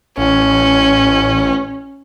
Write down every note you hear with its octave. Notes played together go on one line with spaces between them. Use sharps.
A1 C#4